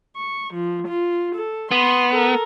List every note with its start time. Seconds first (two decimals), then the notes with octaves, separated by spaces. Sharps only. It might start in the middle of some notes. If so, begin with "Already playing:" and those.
0.16 C#6
0.54 F3
0.87 F4
1.35 A4
1.71 B3 C6
2.11 A4 A#4